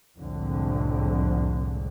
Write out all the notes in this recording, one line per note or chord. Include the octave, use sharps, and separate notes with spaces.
C2 F2 A2 D3 G#3